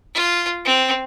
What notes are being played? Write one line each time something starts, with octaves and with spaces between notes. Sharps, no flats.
F4
C4